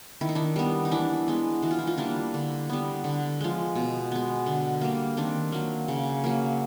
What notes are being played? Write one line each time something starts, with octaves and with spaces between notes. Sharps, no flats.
D#3 E4
D#4
D4 E4
G3 B3
D#4
E3 D4 E4
G#3 B3
E3 F#4
F4
E4
D#4 F4
G3 A#3 D4 E4
D3
G3 B3
D3
F3 G#3
B2
G#3 B3
D3
G3 A#3
D#3 C4 D4
F#3 A#3
C#3
F#3 A#3